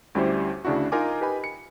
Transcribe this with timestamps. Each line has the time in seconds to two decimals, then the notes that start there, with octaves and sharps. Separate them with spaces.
0.15 D2 G3 C#4 E4 G4 C5
0.65 D2 C#3 D4 E4 F#4
0.92 D#4 F4 A#4 G#5 D6
1.21 G4 B4 D#5 G#5 B5
1.44 C#7